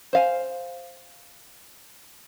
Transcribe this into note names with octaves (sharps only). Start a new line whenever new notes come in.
C5 F5 G#5